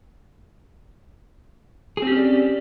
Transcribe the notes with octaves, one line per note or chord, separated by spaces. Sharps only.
C4 C#4 G4 G#4 D5